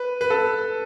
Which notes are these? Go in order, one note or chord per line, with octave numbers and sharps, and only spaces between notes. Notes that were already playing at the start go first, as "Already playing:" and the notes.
Already playing: B4
B4
A4